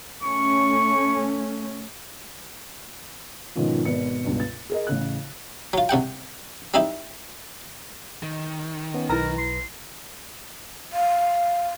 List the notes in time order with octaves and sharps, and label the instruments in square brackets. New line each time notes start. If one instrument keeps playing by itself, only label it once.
[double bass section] A3 C#4 [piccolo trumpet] C#6
[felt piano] G#2 B2 D#3 F3 C#4 F4
G#1 B2 B4 C#7
C#2 G2 B2
A6
G#4 A#4 D#5
A1 C#3 F#6
[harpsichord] F#3 F4
C2 C3 F#5 G5
G3 C4 D#4 E4 G4
[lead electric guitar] D#3
[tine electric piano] B3 C#4
[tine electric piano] B1 B4 A#6 [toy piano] E4 A#5 [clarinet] A#4
[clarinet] C6
[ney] F5